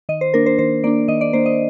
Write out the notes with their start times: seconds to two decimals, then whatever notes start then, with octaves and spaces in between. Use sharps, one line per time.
0.09 D#3 D#5
0.21 C5
0.34 A#3 D4 A#4
0.46 C5
0.59 D#3 C5
0.84 A#3 D4 D5
1.08 D#3 D#5
1.21 D5
1.33 A#3 D4 C5
1.46 D#5